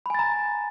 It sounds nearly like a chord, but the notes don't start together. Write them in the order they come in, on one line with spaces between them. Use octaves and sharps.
B5 G#5 A6 A#5